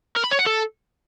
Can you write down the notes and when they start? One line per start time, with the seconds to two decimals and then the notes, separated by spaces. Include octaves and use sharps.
0.16 A#4
0.24 B5
0.31 C#5
0.39 F#5
0.46 A4